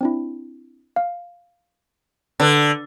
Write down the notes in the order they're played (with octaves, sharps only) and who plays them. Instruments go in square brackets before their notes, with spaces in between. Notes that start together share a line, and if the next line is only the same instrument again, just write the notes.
[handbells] C4 D4 E4
F5
[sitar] D3 [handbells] A4 B4 F#6